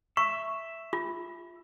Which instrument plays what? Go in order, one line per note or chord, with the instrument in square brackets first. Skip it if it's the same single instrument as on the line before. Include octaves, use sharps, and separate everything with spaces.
[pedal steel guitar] E5 [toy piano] C#6
[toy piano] F4